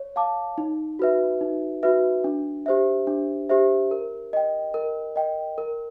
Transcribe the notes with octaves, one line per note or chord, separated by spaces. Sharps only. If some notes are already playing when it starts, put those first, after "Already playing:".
Already playing: C#5
F5 A5 D6
D#4
F#4 B4 E5
D#4
F#4 B4 E5
D4
G4 C5 E5
D4
G4 C5 E5
A#4
D#5 G5
A#4
D#5 G5
A#4